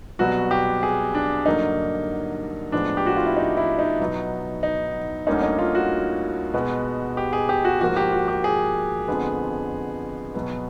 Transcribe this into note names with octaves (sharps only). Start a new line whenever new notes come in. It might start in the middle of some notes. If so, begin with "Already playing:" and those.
C2 B2 F#3 B3 F#4
G4
G#4
D4
G2 D3 F#3 A#3 D#4
A2 F3 G#3 B3 D4
G4
F#4
F4
E4
D#4
E4
D#4
B2 F#3 B3
D#4
D2 D3 G3 A#3 C#4 D#4
D#4
F4
F#4
B2 G#3 B3
G4
G#4
G4
F#4
G#2 F3 A#3 F#4
G4
F#4
G4
G#4
F2 D3 F3 G#3 B3
B2 F#3 B3